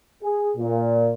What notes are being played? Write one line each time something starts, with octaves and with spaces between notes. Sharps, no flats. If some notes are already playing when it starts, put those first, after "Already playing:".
G#4
A#2